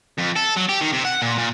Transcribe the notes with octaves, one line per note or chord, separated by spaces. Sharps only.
F2
A4
F#3
G4
D#3
C3
F#5
A#2
A#2